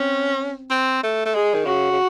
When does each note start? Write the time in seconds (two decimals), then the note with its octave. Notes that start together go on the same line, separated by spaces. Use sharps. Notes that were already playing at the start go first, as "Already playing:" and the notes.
Already playing: C4 C#4
0.70 C4
1.03 A3
1.26 A3
1.35 G#3 G#4
1.54 D#3
1.66 C#3 F#4
1.92 C#3